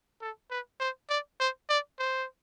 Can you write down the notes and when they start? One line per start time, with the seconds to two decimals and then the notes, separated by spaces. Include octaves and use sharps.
0.21 A4
0.51 B4
0.80 C5
1.10 D5
1.40 C5
1.69 D5
1.99 C5